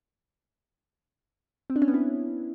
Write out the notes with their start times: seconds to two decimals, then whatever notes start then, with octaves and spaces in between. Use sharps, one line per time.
1.70 C4
1.76 D4
1.82 C#4
1.88 B3
1.94 E4